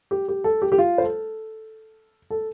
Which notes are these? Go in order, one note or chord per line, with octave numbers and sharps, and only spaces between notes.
G4
G4
A4
G4
G4
F4
C5
A4
A4